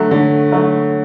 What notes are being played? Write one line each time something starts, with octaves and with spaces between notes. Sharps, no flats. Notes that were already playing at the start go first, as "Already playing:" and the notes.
Already playing: D3 F#3 A3
D3
F#3 A3